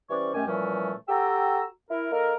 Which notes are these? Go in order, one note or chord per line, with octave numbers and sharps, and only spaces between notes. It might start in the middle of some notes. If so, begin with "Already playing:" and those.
E3 G3 C#4 C5 D5 C#6
F#2 D#3 A3 C#4 G4 G#5
A#2 E3 F3 G3 A3 C#4
F#4 G4 A4 G5 A#5 E6
E4 A#4
A#3 D#4 A4 A#4